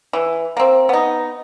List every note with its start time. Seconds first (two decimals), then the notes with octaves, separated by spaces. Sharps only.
0.13 E3
0.57 A#3 C4
0.89 B3 D#4